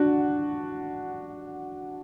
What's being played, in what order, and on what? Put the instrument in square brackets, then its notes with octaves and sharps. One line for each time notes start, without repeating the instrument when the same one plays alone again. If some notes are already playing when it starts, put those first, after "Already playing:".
Already playing: [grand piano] D4 F#4